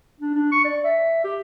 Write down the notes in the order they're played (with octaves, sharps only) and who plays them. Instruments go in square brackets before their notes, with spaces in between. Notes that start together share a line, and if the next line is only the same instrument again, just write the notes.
[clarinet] D4
D4
C#6
D5
E5
G4